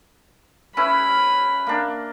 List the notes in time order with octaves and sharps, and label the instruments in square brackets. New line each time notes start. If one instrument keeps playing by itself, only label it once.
[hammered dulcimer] C#4 E4 B4 [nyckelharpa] B5
[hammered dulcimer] A#3 D4